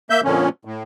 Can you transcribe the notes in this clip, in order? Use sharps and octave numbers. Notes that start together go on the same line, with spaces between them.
A#3 E5 G6
F2 A#2 D3 F3 C#4
A2